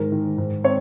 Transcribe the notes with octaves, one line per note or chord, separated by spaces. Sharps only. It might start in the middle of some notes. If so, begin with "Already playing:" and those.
Already playing: G#2 D#3 A#4
D#3
G#2
C4 C#5